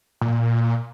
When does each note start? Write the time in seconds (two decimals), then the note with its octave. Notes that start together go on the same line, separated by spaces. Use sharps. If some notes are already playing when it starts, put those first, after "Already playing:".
0.21 A#2